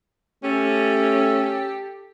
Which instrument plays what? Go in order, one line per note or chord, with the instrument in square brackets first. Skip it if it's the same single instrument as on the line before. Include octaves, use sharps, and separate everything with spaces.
[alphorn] A3 [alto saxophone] C#4 [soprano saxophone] G4 [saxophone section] A4